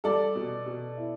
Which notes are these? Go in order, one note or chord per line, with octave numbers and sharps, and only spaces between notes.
G3 A4 D5
B2
B2
E4